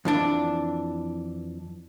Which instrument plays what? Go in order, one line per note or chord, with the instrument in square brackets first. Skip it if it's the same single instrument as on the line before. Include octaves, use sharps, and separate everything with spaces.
[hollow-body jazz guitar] F2 E3 D4